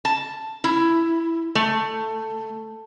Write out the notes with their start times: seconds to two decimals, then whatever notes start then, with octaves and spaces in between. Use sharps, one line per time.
0.05 A5
0.64 E4
1.55 A3